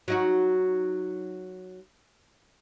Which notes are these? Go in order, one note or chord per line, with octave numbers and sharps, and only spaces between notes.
F#3 D#4 F#4